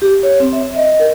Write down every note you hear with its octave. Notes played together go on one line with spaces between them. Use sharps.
G4
C#5
C4
E5
D#5
A#4